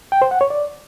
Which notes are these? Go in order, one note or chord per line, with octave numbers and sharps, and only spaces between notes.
G5
C5
F#5
C#5
D5